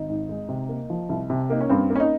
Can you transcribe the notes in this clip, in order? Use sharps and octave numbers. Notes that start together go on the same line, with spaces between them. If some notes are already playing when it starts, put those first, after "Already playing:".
Already playing: G#1 D#4
G#2
G#3
C3
A#3
F3
C2
C3
A#3 D#4
C#4
G2 C4
A#3
C#4
D#4